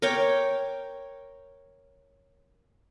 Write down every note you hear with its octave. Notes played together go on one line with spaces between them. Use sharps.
A#4 C#5 G5 D6